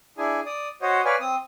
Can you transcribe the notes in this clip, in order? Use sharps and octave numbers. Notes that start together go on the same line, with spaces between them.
D4 E4 G#4 G#5
D5 D#6
F#4 C5 C#5 D#5
B4 C#5 D5 F5 G#5
C4 D#6